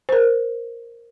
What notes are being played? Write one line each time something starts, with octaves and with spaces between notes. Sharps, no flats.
A#4 C5